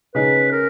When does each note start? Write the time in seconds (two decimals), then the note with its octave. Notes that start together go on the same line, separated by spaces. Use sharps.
0.14 C#3 G#3 D#4 B4
0.52 A#4